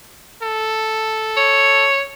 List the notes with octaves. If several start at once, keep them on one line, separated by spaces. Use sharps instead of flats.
A4
C#5